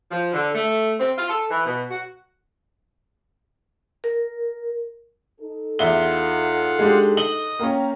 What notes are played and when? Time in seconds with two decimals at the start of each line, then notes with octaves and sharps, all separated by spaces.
0.11 F3
0.34 D3
0.54 A3
0.99 C4
1.17 F4
1.29 A4
1.50 E3
1.66 B2
1.91 F#4
4.04 A#4
5.40 D#4 A4
5.79 E2 F4 E5 F#5 G7
6.79 G#3 D4 G4
7.17 D#5 F#7 G7
7.59 A#3 C#4 G5 A#5